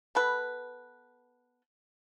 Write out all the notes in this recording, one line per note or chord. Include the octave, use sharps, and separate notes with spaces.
B3 A4 B4